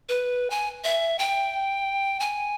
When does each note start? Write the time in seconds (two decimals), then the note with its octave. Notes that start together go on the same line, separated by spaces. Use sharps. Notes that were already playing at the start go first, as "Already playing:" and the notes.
0.09 B4
0.50 G#5
0.84 E5
1.19 G5
2.20 G#5